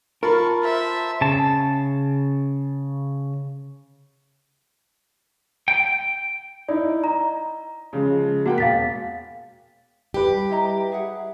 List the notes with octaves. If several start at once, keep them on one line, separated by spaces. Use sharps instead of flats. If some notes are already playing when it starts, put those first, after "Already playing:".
F4 A#4 A5 B5 C#6
C5 E5 A5
C#3 A5
G5
D#4 E4 D5
D#5 A#5
C#3 F3 G#3
A#3 F#4 F#5 G5
E1 F5 A6 B6
G3 G4 A4 B4 G5
E4 D#5 A#5
G#4 E5 F#5